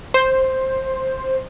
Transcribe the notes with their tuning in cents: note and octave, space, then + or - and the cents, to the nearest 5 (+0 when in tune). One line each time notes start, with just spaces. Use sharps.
C5 +5